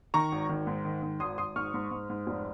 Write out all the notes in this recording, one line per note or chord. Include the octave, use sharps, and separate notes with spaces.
D#3 A#5 C#6
G#1
D#3
G#2
D#3
G#2
G#1 C6 D#6
G#1 C6 D#6
G#2 C#6 F6
G#2
G#2
G#2
F1